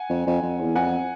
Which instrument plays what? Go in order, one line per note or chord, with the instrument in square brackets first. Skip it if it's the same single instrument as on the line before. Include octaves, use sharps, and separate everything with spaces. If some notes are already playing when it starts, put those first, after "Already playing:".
Already playing: [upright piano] F#5 G#5
[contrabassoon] F2
F2
F2
E2
[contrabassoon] F2 [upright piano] F#5 G#5